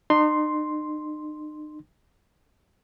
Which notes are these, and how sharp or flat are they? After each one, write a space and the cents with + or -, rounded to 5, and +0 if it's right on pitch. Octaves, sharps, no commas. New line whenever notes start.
D#4 -40 C6 +0